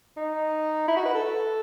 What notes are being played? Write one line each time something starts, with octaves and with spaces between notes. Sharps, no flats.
D#4
E4
F#4
B4
A4